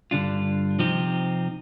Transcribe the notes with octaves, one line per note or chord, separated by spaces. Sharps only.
G2 D3 G3 D4 F4
C3 F3 C4 D#4 G4